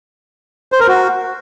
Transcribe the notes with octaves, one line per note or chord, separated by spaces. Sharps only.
C5
A#4
F#4